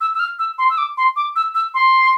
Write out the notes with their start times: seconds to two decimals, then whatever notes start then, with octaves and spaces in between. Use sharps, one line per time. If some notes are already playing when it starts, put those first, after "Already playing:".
0.01 E6
0.15 E6
0.19 F6
0.39 E6
0.58 C6
0.70 E6
0.78 D6
0.97 C6
1.16 D6
1.36 E6
1.55 E6
1.74 C6